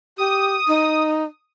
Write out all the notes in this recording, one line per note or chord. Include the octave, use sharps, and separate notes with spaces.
G4 D#6
D#4